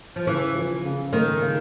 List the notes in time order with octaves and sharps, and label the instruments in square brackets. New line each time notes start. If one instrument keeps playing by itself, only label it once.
[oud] F3
[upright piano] C#3 [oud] E3
[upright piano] F3
C#3
[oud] D#3 [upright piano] A3
[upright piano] C#3